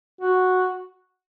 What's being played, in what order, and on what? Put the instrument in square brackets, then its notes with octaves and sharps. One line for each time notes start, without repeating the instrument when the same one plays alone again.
[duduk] F#4